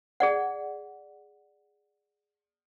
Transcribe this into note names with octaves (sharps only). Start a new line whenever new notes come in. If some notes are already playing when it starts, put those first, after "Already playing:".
G#4 D5 F#5